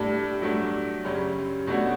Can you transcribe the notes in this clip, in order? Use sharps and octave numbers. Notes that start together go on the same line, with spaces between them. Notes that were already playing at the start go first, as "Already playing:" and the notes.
Already playing: A2 G3 D4 A4
G2 F#3 A3 D4
F#2 C#3 G3 C#4
B2 A3 D4 F#4 C#5